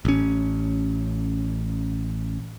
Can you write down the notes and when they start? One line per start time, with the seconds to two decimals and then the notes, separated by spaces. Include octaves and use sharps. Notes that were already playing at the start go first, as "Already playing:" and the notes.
0.05 A1 C#4